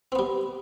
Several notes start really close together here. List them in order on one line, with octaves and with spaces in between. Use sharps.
C4 B3 G3